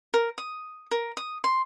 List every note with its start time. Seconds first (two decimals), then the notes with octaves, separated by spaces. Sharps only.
0.14 A#4
0.38 D#6
0.91 A#4
1.17 D#6
1.44 C6